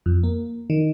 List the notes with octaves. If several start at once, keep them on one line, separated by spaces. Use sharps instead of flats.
F2
A#3
D#3